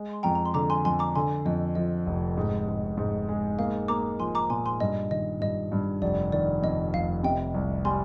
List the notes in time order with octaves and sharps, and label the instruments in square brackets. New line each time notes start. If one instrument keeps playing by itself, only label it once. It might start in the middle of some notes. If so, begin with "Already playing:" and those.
Already playing: [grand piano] G#3
[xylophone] C6
[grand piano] F2 [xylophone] G5 A#5
[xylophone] A#5
C6
[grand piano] D3 [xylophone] A#5 D6
[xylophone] G#5 C6
[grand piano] F2 [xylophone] G#5 C6
[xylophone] A#5 D6
[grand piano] D3 [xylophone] G#5 C6
[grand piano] F2 [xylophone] D#5
[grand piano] F3 [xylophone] D#5
[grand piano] F1
G#2
G#2
G#2
G#3
[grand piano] A#3 [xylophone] F5
[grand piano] A#3 [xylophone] A#5 D6
[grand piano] F3 [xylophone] G#5 C6
[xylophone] A#5 D6
[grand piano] A#2 [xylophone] G#5 C6
[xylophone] G#5 C6
[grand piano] G2 [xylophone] D#5
[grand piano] D#3 [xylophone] D#5
[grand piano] G2 [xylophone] D#5
[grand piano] G2
[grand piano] F1 [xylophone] D5
[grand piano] D#3 [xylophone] D5
[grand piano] F2 [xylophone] D#5
[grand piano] F1 [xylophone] F5
[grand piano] C3 [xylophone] D#5 G5
[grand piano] C2
[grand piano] G3 [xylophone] G#5 C6